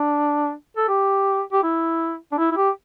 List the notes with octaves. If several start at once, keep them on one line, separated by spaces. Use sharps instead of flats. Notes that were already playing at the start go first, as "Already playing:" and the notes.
Already playing: D4
A4
G4
G4
E4
D4
E4
E4
G4